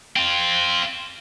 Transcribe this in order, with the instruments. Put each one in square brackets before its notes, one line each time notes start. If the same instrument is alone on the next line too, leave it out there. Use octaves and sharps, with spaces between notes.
[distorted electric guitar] C4 F4